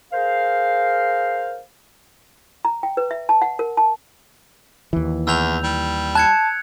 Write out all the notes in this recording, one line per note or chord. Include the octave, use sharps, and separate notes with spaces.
G#4 A#4 C5 F5
A#5
G5
B4
E5
A5
F#5
A#4
A5
D#2 E3
E2 E6 G6 F7
G3
A5 F#6 G#6 C#7